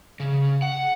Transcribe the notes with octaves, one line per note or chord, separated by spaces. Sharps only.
C#3
F#5